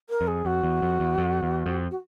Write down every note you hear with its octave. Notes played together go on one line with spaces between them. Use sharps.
A#4
F2
G#4
F2 F#4
E2
F2
E2
F2
E2
F2
F#4